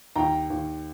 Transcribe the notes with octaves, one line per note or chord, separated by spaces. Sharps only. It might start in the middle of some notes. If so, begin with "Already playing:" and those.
D#2 G5 A#5
D#2